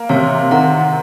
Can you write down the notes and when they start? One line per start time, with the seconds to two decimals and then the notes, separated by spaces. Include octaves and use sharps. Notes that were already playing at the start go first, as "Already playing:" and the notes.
Already playing: A#3
0.09 C3 C#5 F5
0.51 D#3 F#5 A#5